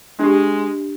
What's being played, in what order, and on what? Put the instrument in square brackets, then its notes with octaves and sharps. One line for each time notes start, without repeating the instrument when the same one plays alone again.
[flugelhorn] G#3 [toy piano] D4 G4